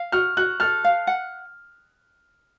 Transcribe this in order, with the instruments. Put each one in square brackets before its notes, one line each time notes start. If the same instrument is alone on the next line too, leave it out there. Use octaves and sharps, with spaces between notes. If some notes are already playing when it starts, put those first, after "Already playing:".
Already playing: [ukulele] F5
[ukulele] F#4 [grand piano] F6
[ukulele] F#4 [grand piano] F#6
[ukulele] A4 [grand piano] F6
[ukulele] F5
F#5